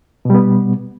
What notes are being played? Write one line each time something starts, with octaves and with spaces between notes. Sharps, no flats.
B2 G3 B3